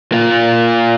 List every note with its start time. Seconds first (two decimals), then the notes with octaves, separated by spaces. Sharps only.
0.12 A#3 F4